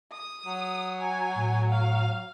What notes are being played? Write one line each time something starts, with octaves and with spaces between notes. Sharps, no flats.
D#6
F#3
G#5
A2
F5